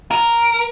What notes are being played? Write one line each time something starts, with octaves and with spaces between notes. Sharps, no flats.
A#4